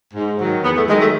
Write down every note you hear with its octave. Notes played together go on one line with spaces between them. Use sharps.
G#2
D#3 F#3
E2 B3
A3
D#3 F#3 G#3
A3